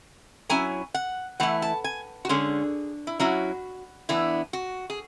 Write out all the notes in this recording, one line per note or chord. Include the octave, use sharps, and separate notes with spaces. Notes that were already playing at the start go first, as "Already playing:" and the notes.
F#3 C#4 E4 G#5
F#5
E3 A3 E4 F#5
A5
G#5
F#4
D3 G#3 C#4 G#4
E4
F#3 C#4 E4 F#4
E3 B3 D4 E4
F#4
G#4